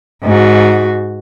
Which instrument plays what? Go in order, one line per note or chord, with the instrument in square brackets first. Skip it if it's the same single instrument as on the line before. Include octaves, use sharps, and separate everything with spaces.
[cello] G#2 F#4